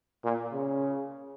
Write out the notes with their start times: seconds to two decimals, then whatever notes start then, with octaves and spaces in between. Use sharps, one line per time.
0.24 A#2
0.53 C#3